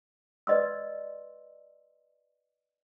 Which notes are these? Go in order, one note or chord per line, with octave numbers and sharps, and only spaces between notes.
B4 D5 D#5 C6 E6